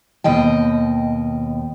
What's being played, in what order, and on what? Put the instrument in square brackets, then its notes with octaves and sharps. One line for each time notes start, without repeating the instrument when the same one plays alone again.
[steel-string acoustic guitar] D#2 B2 D#5 G5